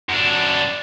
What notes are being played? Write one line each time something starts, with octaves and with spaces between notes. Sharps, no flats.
F#2 D4